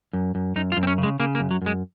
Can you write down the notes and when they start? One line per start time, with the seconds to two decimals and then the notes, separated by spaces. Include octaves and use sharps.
0.13 F#2
0.35 F#2
0.56 F#2 D#4
0.72 F4
0.77 F#2
0.83 C4
0.87 C#4
0.98 C#3
1.03 G#3
1.20 C#3 A#3
1.35 A#3
1.40 F#2
1.51 F#3
1.62 F#2 G#3